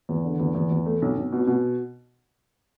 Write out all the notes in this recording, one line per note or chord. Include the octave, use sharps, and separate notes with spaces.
E2
D3
E2
E2
E2
A3
B1
B1
B2
B2